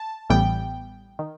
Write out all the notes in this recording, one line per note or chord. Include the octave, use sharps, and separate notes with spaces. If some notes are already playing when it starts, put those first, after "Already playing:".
Already playing: A5
A1 A2 E3 G3 B3 G5
D#3